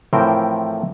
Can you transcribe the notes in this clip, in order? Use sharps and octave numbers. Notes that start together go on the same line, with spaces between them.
A2 E3 F3 C4 A#4 G5